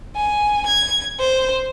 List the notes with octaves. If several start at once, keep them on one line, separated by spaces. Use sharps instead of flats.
G#5
G#6
C5